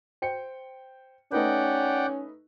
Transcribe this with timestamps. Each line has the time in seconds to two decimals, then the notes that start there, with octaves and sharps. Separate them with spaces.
0.22 C5 G5 C#7
1.32 A3 C#4 D#4 B4 D5 F#5 G5